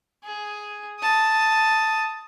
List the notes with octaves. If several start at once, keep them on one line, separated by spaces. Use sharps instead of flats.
G#4
A5 D#6